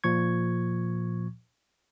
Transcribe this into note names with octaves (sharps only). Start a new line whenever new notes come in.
A#2 F3 C#6 G#6